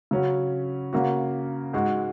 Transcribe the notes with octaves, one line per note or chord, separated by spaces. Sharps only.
C#3 F#3 C#4 F#4
C#3 A#3 F#4
G#2 G#3 F#4